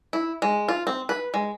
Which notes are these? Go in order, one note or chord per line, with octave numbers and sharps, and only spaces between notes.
E4
G#3
F4
C4
B4
G#3